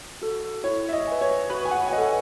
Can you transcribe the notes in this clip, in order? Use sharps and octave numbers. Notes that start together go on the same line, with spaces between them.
F#4 A4
E4 C#5
E5
D#5
B4 E5 G#5
C#5
F#4 B4
G#5
F#5
G#5
A4 D#5 F#5